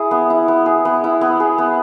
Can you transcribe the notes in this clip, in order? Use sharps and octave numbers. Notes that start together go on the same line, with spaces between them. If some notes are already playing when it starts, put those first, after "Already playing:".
Already playing: E4 G#4
B3
E4
B3
G#4
B3
E4
B3
G#4
B3